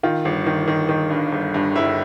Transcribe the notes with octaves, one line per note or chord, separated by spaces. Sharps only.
D#3 F4
G1
D#3
D#3
D#3
G2
G1
G2
G1 E4